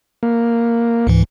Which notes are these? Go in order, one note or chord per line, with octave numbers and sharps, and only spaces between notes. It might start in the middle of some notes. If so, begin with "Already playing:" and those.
A#3
C#2 G#2 E3